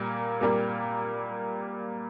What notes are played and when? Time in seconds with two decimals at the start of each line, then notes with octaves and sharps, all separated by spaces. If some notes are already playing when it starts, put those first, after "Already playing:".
Already playing: A#2 G3 A#3
0.41 A#2 G3 A#3